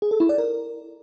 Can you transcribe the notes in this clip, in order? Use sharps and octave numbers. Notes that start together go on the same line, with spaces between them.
G#4
A4
E4
D5
A#4